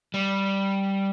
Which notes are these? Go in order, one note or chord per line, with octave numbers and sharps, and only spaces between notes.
G3